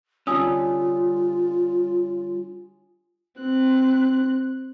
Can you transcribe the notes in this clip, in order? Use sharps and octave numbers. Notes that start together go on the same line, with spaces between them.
D3 G3 C#4 F4 G#5 D#6 E6
C4 F#6